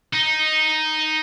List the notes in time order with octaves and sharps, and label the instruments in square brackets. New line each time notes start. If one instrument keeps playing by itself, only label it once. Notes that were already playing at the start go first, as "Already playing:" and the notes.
[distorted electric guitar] D#4